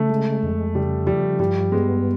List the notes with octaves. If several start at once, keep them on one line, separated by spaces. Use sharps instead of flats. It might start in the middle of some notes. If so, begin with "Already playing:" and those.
Already playing: C#3 A3
G#3
F2
C#3 G3
F3 G3
G2 G3
G#3 B3